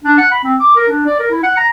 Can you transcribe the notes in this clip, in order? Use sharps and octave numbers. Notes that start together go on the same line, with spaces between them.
D4
F#5
B5
C4
D6
A#4
D4
D5
A#4
E4
F#5
A#5